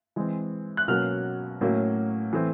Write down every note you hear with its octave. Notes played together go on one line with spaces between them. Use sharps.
E3 G#3 C4
F#6
B2 F#3 A#3 C#4 F6
A2 F#3 A#3 C#4
E3 A3 C4